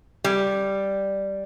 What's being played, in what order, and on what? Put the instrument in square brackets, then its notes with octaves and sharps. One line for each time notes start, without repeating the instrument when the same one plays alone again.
[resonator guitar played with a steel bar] G3